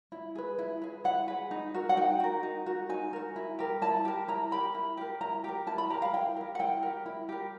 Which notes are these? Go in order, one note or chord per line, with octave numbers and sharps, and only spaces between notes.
E4
G#4 B4
E4
G#4 B4
E4 F#5
G#4 B4
D#4
F#4 A#4
F#5
D#4 G5
F#4 A#4
D#4
F#4 A#4
D#4 G#5
F#4 A#4
E4
G4 A#4
E4 A5
G4 A#4
E4 A#5
G4 A#4 B5
E4
G4 A#4
E4 A#5
G4 A#4
E4 A5
B5
G4 A#4 A#5
F5
E4 G5
G4 A#4
F#5
E4 G5
G4 A#4
E4
G4 A#4